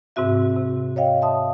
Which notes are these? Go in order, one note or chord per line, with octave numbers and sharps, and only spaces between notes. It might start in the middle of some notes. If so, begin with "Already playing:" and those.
G#2 C3 C4 F#4 E5
C3
C#5 D#5 F5 G5
E5 A5 C6 D#6